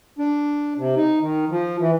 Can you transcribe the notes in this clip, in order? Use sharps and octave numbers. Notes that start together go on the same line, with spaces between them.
D4
C3
D#4
D#3
F3
E3